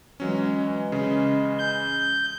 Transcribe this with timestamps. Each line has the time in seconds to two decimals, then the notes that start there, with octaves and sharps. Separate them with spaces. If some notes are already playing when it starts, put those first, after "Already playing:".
0.20 E3 F#3 G#3 C#4
0.92 C#3 C#4
1.59 G6